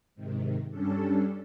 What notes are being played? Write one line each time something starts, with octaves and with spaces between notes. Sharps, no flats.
G#2 C3 D#3
G2 G3 C#4 D4 A4